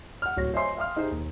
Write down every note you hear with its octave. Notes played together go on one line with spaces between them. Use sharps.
F#5 F6
D1 F#4 C#5 A#6
C5 C#5 D#5 E5 G#5 C6
E5 F5 G5 C6 D#6 F6
D#4 G4 G#4 C5
D#2